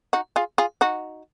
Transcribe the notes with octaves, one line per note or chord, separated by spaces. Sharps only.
D#4 F#4
F4 G#4
F4 G#4
D#4 F#4